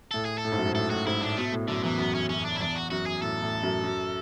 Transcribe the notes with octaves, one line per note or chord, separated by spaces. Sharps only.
A2 A4
G#4
A4
A2
G#2
F#2
G#2
A2 A4
A2 F#4
G#2 E4
A2 D4
B2 A3
A2
F#2 D3
E2 E3
F#2 B3
C#4
F#2 C#4
D4
E4
E2 D4
F#4
F#2 F#4
G#4
A2 A4
A2
F#2
F#2